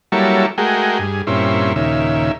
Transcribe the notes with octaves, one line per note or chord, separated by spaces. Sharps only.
F#3 G3 A#3 E4 A4 C#5
G#3 A3 F#4 G#4 A#4 G5
G2 G#4
G2 A#2 C4 C#4 E4
D#2 A#2 C#3 E5